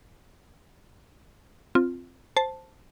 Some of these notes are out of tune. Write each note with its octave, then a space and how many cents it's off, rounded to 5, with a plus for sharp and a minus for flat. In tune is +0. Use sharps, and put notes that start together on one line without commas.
C4 +0 F4 +0
C5 +0 A5 +0